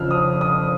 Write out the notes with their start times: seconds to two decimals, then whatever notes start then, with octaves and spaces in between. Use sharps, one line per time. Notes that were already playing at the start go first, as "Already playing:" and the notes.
Already playing: F2 C#3 F3 E6 F6
0.11 D#6
0.41 D#6